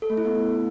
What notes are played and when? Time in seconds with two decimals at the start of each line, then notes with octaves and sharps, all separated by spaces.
0.02 A4
0.10 A3
0.17 E4
0.25 B3